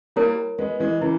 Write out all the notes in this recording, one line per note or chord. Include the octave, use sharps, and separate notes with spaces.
G3 A#3 E4 A#4 C#5
G#3 B3
E3 G#3
C#3 E3 E4